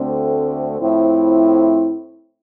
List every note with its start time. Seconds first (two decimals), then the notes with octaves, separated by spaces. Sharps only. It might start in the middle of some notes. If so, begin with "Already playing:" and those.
Already playing: D2 D3 A3 C4
0.80 A2 F3 C4 E4